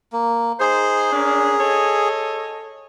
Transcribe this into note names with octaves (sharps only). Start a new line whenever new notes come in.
A#3
D#4 G#4 C5
C#4 D4 A#4
A4 C#5 D#5